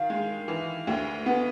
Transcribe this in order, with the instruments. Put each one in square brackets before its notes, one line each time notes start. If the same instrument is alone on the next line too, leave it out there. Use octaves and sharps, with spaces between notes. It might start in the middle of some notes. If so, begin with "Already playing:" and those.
Already playing: [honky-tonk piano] D#3 [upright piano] F5
[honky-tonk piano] G#3
E3
D2
B3